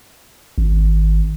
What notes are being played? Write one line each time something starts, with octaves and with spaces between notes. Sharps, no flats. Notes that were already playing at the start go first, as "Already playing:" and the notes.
G#1